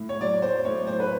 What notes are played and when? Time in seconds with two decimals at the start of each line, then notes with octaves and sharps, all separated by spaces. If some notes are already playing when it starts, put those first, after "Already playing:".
Already playing: A2
0.09 C#5
0.21 F#3 D5
0.42 C5
0.65 A2 C#5
0.87 C5
1.00 B4